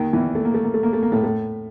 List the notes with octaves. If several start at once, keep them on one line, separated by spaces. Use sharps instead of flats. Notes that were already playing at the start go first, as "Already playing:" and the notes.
Already playing: D#2 D#3
E2 E3
A3
A#3
A3
A#3
A3
A#3
A3
A#3
A2 A3
A2 A3